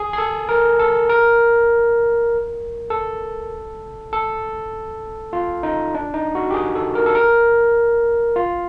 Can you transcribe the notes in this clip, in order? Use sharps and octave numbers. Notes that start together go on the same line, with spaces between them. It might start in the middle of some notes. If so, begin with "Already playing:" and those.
Already playing: G#4
G#4
A4
A#4
A4
A#4
A4
A4
F4
D#4
D4
D#4
F#4
G4
G#4
A4
A#4
A4
A#4
F4